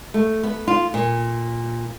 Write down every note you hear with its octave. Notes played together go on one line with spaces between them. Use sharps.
A3
B3
F4
A#2